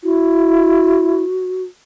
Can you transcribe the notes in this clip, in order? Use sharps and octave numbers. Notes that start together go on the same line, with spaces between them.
E4 F#4